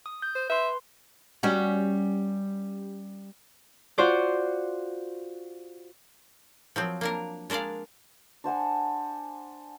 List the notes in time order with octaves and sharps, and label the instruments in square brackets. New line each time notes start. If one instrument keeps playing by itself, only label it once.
[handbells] D#6
G6
[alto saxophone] C5
[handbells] B4 C6 [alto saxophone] E5
[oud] G3 C#4 F#4
[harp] F4 F#4 C5 D5
[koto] F3 F#3 C4
A#3 D4 A#4
G#3 D4 A#4 D5 F5
[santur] D4 C5 F#5 G#5